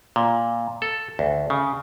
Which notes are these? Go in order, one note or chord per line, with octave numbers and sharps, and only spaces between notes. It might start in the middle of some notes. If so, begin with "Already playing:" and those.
A#2
A4
D2
C#3